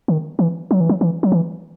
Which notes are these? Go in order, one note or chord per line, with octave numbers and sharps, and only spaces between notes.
D#3
E3
F#3
E3
F#3
E3
F#3
E3